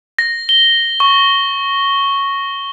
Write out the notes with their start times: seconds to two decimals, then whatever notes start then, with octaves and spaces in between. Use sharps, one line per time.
0.19 A#6
0.49 G7
1.00 C#6